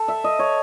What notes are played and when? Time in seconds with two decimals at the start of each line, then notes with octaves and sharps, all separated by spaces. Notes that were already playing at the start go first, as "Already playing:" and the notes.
Already playing: A4
0.08 E5
0.24 D#5
0.39 C#5